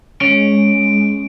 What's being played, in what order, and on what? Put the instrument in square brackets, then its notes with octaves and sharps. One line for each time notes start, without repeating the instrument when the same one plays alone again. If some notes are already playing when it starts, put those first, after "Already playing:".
[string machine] G#3 [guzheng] C#4 [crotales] D7